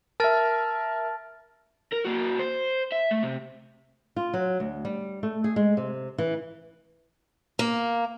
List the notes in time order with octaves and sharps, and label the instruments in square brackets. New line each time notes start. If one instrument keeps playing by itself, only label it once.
[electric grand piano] A#4 E5 [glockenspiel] A5 F6 A6
[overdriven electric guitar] A#4
A#3 F#4
C5
E5
A3
C3
[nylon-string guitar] F4
F#3
D2
G3
A3
G#4
G#3
C3
E3
[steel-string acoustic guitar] A#3